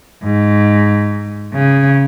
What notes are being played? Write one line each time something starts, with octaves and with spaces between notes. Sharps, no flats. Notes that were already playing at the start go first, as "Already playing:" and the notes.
G#2
C#3